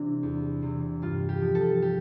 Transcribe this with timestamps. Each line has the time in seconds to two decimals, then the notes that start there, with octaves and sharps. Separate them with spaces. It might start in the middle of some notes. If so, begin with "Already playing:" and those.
Already playing: C3 E3 C4 D4
0.23 E2
0.62 C3 E3
1.02 G2 F4
1.29 G4
1.42 F3
1.55 A4
1.82 G4